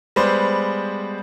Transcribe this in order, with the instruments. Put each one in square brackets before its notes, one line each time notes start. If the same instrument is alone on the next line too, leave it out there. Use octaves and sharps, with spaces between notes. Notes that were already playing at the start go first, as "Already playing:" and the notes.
[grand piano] G3 G#3 B3 C5 D5